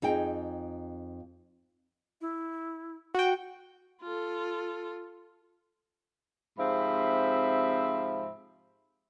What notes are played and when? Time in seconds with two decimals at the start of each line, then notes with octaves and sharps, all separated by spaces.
0.02 F2 D#4 G#4 G5
2.21 E4
3.14 F#4 F#5 G5
4.02 F4 A4
6.58 G#2 C3 F3 C4 E5 B5